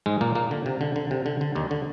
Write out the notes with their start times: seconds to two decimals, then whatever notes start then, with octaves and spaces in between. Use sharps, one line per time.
0.06 G#2 G#3
0.21 A#2 A#3
0.35 A#2 A#3
0.51 D3
0.66 C3
0.81 D3
0.96 D3
1.11 C3
1.26 D3
1.41 D3
1.55 D#2 D#3
1.71 D3